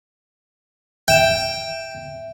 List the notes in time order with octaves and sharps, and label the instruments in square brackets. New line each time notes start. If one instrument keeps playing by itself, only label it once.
[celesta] E5 E7 [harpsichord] G5